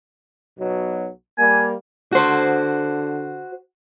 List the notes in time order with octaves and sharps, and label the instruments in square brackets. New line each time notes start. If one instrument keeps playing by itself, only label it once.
[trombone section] B1 B2 F#3
[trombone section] G3 A#3 [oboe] G#5
[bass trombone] D3 [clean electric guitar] F#4 C5